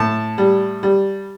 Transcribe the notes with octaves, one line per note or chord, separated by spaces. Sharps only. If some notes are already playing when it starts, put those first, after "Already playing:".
Already playing: A2 A5
G3
G3